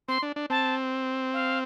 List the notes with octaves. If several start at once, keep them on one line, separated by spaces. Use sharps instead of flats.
C4 C6
D4
D4
C4 A5
F5